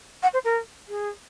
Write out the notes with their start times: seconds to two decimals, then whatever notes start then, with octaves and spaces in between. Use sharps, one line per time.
0.23 F#5
0.34 C5
0.44 A#4
0.88 G#4